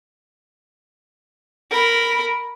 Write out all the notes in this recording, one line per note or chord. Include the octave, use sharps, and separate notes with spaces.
A#4 B5